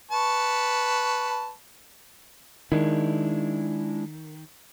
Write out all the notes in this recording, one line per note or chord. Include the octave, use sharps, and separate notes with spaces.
B4 A5 C#6
D#3 G#3 D4 E4